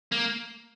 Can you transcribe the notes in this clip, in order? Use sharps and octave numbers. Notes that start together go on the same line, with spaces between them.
A#3